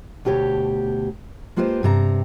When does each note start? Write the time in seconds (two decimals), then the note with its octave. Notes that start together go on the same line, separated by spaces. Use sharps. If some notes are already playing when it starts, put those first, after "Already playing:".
0.25 D2 B2 G4 A4 C#5
1.56 G#3 A#3 F4 G4 B4 C5
1.83 G2 C3 A#5